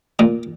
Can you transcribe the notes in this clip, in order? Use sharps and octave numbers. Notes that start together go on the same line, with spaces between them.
A#2